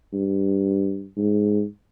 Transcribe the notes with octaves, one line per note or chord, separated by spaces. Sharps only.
G2
G#2